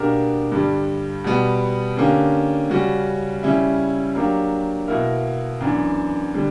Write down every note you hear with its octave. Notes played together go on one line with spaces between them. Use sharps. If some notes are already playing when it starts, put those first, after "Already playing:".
Already playing: B2 A#3 D4 G4 A#4
G2 D3 G3
B2 G3 B3
D3 A#3 C#4 G4
C#3 G3 C#4 F#4
C#3 G3 C#4 E4
F#3 A#3 D4 G4
B2 A#3 E4 A#4
F#2 E3 B3 D4
D3 G3